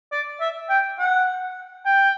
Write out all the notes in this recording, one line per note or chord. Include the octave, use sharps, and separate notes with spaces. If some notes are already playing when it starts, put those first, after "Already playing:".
D5
E5
G5
F#5
G5